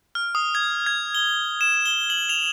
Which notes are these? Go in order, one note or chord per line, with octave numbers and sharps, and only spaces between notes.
F6
D#6
G#6
G#6
G7
E7
G7
F#7
F7